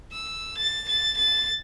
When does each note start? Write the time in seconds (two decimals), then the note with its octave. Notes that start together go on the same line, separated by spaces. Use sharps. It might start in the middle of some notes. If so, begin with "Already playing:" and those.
0.12 E6
0.57 A6
0.88 A6
1.17 A6